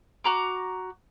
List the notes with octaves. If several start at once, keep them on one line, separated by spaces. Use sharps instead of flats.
F#4 A#5 D6